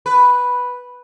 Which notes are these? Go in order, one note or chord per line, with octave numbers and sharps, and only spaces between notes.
B4